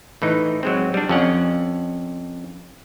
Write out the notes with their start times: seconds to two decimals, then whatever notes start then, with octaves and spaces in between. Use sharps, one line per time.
0.22 A2 E3 D#4
0.63 F#3 G#3 C4
0.94 G3 D4
1.09 F2 C#4 F#5